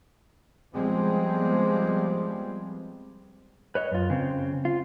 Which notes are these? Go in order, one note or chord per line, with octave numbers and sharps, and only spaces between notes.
F3 G3 G#3 B3 C4
B4 C#5 D#5
F#2 F4
C#3 C4
F4